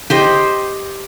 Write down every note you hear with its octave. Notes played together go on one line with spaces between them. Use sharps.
G4 C5 D#5